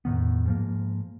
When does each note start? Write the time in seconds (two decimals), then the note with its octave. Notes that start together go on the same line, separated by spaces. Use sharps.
0.05 E2 A2 D#3 B3
0.46 G#2 F3 A#3